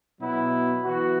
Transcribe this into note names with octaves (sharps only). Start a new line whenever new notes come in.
B2 F#3 B3 E4
E3 B3 F#4